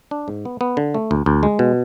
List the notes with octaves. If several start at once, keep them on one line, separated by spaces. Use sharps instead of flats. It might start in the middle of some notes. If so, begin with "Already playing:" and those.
D4
G#2
B3
B3
D3
A3
D2
D2
G#3
B2